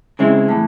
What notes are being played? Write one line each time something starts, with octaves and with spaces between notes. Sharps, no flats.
C#3 G#3 C4 E4
A2 E3